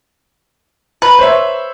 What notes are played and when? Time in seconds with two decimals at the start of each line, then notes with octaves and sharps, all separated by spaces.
1.02 B4 A#5
1.19 C5 C#5 E5